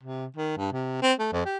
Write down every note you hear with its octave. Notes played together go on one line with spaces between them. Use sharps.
C3
D#3
G2
C3
C4
A3
F2
G4